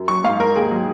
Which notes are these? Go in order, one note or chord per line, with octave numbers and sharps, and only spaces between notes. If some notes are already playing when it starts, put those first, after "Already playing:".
Already playing: F#2
F#3 C#6
G#2 F5
G#2 A#4
D#2 G#4
F#3